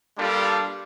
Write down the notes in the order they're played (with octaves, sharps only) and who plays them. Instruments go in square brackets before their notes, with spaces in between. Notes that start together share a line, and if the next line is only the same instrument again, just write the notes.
[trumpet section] G3 A#3 D4 F4 G4 A4